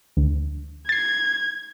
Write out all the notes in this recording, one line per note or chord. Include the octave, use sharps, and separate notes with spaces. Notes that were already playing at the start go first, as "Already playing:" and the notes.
D2
G#6 A6 C7